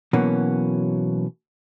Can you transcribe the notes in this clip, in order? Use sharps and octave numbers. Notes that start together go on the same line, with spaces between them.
B2 E3 F#3 A#3 C#4